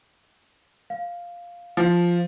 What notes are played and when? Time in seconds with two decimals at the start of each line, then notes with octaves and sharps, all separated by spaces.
0.90 F5
1.77 F3